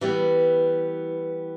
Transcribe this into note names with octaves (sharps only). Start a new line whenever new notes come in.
E3 G3 B3